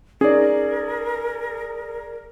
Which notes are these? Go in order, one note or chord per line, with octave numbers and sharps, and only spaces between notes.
C#4 D#4 G#4 A#4 D5